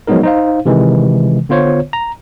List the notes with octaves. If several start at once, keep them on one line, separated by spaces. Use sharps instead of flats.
F3 F#3 G#3 B3 D#4 A#4
D#4 C5 F5
C3 D#3 E3 G#3
D3 B3 F4 C5 C#5
A#5